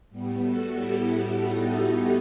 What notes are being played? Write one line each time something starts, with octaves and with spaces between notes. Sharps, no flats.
A2 G3 B3
F#4 A4
E4 G4
D#4 F#4
E4